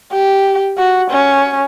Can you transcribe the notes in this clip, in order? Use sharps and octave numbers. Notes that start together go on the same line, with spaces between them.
G4
F#4
C#4